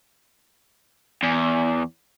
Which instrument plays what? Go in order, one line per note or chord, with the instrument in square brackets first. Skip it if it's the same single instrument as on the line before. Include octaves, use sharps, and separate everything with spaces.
[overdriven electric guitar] E2